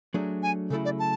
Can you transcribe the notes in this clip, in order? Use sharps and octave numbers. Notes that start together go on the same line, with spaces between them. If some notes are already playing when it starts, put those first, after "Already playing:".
F#3 A3 D4 G#4
G#5
C#3 F#3 A3 E4 A4
D5
A5